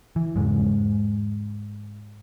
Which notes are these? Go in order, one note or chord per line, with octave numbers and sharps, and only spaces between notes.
E3
E2 G#2 C#3 G#3